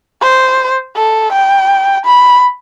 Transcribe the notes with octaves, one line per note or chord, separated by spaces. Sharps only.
C5
A4
G5
B5